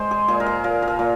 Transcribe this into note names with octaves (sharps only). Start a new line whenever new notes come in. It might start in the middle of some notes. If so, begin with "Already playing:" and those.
Already playing: G#3 C5
G#4
A#2 G#4
A#4
G#4
A#2 A#4
A#4
G#4
A#2